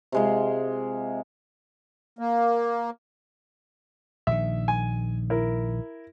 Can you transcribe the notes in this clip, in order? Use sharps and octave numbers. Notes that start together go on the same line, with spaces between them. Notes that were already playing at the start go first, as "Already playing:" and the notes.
C3 G#3 F4
A#3
A#1 D#3 E5
G#5
E4 A#4